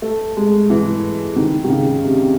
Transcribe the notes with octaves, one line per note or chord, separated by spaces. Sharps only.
A3
G#3
E3
D#3
D#3
C#3
C3